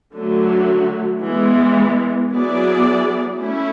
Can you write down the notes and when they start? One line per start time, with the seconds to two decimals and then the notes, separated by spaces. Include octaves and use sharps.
0.15 D3 F#3 A3
1.24 E3 G#3 B3
2.32 F#3 B3 E4 G#4 D5
3.40 A3 C#4 E4